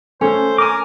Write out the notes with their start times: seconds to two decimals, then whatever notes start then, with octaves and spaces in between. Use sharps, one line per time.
0.21 A3 C#4 C5
0.58 A#4 G#5 D6